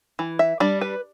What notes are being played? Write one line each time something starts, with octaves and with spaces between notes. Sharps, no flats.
E3
E5
G3 D4 D5
B4